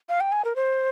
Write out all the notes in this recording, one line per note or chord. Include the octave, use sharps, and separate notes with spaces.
F5
G5
G#5
A#4
C5